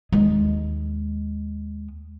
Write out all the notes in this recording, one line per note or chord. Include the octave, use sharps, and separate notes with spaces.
D#2 G#3